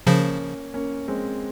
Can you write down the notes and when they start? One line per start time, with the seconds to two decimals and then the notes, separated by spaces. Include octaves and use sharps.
0.07 C#3 F3 A#3 C#4
0.74 A#3 C#4
1.08 G#3 C4